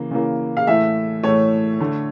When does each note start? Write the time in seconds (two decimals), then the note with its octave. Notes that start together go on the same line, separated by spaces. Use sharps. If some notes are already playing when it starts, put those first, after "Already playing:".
Already playing: C#3 E3 A#3
0.11 C#3 E3 A#3
0.57 F5
0.67 A2 E3 A3 E5
1.24 A2 E3 A3 C#5
1.80 D3 A3